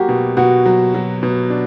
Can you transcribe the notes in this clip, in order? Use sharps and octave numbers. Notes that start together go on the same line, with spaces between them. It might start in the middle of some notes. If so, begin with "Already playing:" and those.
Already playing: F#3 A#3 F#4 G4
B2
B2 F#4
F#3
F#3
B2
D4